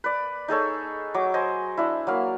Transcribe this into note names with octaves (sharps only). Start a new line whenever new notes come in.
B4 D5
D#4 G#4 A4 C#5
F#3 D6
C5 D#5 G#5
D4 E4
F#3 A#3 F5